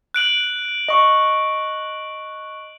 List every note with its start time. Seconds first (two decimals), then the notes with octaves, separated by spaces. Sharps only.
0.14 F#6 D7 F#7
0.88 D#5 C#6